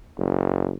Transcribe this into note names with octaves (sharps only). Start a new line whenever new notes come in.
F#1